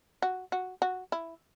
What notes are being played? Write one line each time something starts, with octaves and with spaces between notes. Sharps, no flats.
F#4
F#4
F#4
E4